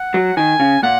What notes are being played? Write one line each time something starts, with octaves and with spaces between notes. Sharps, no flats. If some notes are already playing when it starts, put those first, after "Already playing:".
Already playing: F#5
F#3
D#3 G#5
C#3
A#2 F#5